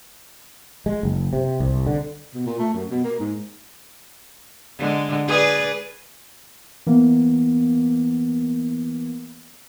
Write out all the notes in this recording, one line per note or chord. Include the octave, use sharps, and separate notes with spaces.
G#3
F#1
C3
C2
D3
B2
A#2
A3
F#2
B2
A#3
G#2
D3 G#3
G#4 B4 D5
E3 A#3 B3